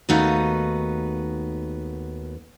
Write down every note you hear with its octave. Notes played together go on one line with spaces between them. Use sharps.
D#2 A3 B3 D#4 F#4 F5